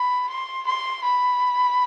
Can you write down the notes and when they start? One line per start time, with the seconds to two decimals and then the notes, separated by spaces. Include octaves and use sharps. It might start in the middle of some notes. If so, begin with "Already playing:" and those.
Already playing: B5
0.29 C6
0.66 C6
1.04 B5